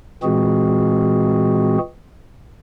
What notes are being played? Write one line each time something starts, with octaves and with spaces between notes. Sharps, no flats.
A#2 E3 G#3 C4 F#4 G#4